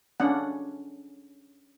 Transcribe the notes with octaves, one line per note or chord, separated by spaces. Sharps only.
C#4 D4 F#5